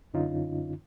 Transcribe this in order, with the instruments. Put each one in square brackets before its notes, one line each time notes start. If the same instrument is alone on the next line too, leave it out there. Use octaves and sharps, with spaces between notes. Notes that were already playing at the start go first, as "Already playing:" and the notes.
[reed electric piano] F#2 D3 C#4 D#4 F4